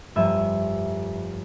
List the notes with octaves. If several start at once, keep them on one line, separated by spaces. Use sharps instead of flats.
F1 G2 E5 D#7